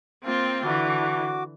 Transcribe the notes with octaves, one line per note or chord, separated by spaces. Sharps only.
A#3 C4 F4
D3 E3 F#4 D6